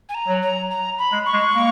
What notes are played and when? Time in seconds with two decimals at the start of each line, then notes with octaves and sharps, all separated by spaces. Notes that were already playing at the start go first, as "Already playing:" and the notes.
0.09 G#5
0.14 A#5
0.28 F#3
0.42 A#5
0.70 A#5
0.99 B5
1.12 G#3
1.26 C#6
1.33 G#3
1.55 A#3